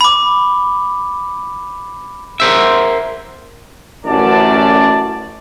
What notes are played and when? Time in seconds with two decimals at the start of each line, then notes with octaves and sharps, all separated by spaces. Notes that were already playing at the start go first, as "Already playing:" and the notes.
0.01 B5 D6
2.40 A#4 C5 E5
4.06 A1 F#2 D5 A5